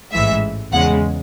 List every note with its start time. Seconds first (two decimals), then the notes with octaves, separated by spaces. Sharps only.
0.12 A1 G#2 E3 G#3 E5
0.72 E2 C#3 G#3 F#5